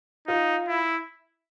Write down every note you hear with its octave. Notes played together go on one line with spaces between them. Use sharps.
D#4 F4
E4